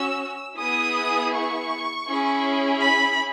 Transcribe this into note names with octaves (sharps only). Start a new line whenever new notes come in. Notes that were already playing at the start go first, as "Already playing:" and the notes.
Already playing: C#4 F#4 E6
B3 E4 G#4 D#6
C#6
C#4 E4 G#4
B5